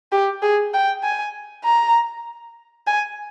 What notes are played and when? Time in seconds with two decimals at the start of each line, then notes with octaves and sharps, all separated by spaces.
0.12 G4
0.42 G#4
0.74 G5
1.04 G#5
1.65 A#5
2.87 G#5